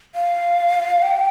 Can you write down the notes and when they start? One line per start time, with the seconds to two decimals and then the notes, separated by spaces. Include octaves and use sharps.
0.15 F5
1.02 G5